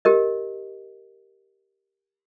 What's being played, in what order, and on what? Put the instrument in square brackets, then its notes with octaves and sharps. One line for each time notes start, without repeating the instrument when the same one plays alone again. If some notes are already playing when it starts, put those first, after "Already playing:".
[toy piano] G4 A#4 D#5